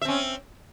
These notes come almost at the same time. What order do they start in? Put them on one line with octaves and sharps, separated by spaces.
E5 C4 C#4